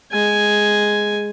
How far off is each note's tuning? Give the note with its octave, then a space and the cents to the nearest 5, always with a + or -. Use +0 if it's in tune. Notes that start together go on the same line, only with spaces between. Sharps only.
G#3 +0 G#5 +0